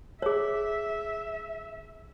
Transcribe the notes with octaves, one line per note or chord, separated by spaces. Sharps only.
G#4 C#5 E5